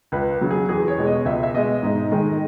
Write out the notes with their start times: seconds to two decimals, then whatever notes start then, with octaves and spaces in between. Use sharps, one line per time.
0.12 C#2 B4
0.41 C#3 F#3
0.51 G#4
0.69 E2 G#4
0.88 C#5
0.98 B2 G#3
1.07 D#5
1.25 C#2 E5
1.43 E5
1.54 B2 G#3 D#5
1.83 G#2
2.12 D#3 G#3